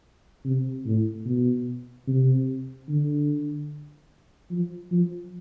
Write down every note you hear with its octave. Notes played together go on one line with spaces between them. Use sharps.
C3
A2
B2
C3
D3
F3
F3